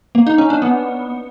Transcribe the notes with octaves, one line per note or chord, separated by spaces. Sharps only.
A#3
D#4
C#4
D4
B3